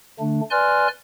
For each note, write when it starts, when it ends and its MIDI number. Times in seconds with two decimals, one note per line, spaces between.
0.20 0.41 50
0.20 0.41 57
0.20 0.41 62
0.51 0.88 71
0.51 0.88 74
0.51 0.88 80
0.51 0.88 84
0.51 0.88 89
0.51 0.88 90